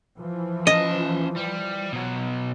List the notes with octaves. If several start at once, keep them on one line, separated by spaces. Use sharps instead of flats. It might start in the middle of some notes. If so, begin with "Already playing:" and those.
E3 F3
C#4 D#5 A5
G3
B2 F#3